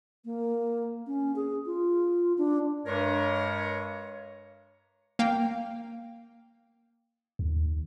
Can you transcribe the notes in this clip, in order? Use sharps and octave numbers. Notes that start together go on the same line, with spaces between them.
A#3
C#4
G#4
F4
D4
G2 G#3 A#4 C#5
A#3 F5 G5
D#2